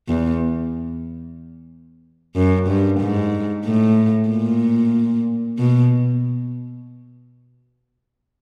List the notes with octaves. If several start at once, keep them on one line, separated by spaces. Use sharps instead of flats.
E2
F#2
G2
G#2
A2
A#2
B2